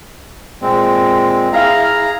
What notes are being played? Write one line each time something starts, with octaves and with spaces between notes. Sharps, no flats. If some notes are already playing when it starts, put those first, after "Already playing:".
A#2 G#3 C4
E4 G#4 F5 A#5